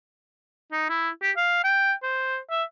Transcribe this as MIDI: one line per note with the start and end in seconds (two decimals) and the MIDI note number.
0.72 0.87 63
0.89 1.09 64
1.22 1.31 67
1.37 1.62 77
1.64 1.93 79
2.03 2.37 72
2.50 2.63 76